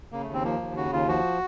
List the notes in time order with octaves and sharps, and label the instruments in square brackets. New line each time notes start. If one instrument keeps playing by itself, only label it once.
[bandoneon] C#3 A#3
A3
D#2
C4
F3 A#3
D#2
C#3 F#4
D#2 F4
F3 F#4